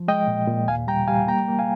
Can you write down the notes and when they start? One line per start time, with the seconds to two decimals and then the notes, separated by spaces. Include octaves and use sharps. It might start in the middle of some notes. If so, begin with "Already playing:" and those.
Already playing: F3
0.08 G#3 D#5 G5
0.28 A#2
0.47 A#2
0.68 D#2 F5 G#5
0.87 G3 G5 A#5
1.08 G3 F5 G#5
1.28 A#3 G5 A#5
1.48 A#3
1.59 F5 G#5